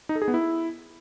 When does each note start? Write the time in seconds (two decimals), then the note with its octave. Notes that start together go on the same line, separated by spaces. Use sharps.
0.09 D#4
0.15 A4
0.22 G#4
0.28 B3
0.34 E4